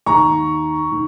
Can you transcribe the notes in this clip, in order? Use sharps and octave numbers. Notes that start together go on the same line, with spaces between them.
D#2 D#3 A#5 C#6
D#3